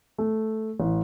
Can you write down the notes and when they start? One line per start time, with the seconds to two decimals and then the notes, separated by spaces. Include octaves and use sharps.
0.18 A3
0.80 A1